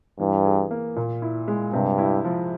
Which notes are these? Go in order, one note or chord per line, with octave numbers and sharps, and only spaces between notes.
G2 E3
G#4
A#3
A#2
E4
G#3
G2 C3
E4
F3